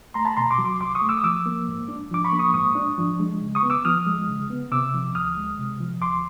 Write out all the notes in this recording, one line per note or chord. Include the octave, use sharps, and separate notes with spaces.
A3 A#5 C6
A5 B5
B2 A#5 C6
C6 D6
F#3
C6 D6
C2 C6 D6
C#6 D#6
A3
D6 E6
D#6
F3 D6 E6
A#3
G#2
D4
F3 D6
B5 C#6
A#3
C#6 D#6
G#2 C#6 D#6
D4
F3
G#3
C#3
C#6 D#6
B3
D6 E6
F3 D#6 F6
G#3
C#3
B3
C3 D6 E6
F3
D2 D#6 F6
G#3
C3
F3
D2 C6 D6